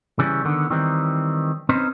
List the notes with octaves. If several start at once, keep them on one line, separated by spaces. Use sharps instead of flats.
C#3 E3 G3 C#4
D3 D#3 B3
D#3 E3 G3 C4 D#4
C4 C#4 D#4 B4 C5